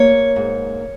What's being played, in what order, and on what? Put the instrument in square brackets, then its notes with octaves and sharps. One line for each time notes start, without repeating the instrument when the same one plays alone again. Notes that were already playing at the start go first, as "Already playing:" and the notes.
Already playing: [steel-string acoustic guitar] A#3 C#5
G#2